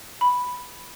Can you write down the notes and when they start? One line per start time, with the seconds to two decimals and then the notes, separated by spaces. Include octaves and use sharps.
0.21 B5